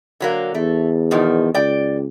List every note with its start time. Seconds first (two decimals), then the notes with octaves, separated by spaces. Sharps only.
0.20 D3 F#3 A#3
0.55 E2 A3
1.11 B2 D#3 F3
1.54 C#2 D5 G5